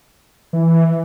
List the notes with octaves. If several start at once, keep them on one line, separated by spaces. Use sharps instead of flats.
E3